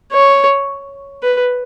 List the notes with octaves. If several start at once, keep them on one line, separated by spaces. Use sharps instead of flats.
C#5
B4